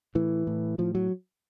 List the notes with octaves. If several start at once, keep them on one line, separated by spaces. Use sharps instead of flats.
A2 E3
A2
A2 F3
F#3